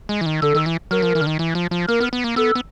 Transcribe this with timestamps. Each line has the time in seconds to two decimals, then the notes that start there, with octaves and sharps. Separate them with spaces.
0.09 G#3
0.21 E3
0.26 D#3
0.42 D3 A4
0.55 D#3
0.66 E3
0.91 F#3 A#4
1.02 F3
1.15 E3
1.21 D3
1.27 D#3
1.39 E3
1.55 F3
1.71 F3
1.88 A#3 A#4
2.00 B3
2.13 B3
2.24 A#3
2.36 B3 A4
2.55 B3